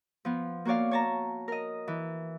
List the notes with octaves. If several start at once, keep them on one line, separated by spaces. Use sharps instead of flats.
F3 B3
A#3 F#4 C#5 D5 F5
C#5 A5 A#5
A#4 D#5
E3